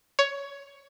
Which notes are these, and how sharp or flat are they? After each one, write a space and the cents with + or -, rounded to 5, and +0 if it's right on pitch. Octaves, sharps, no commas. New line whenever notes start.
C#5 +15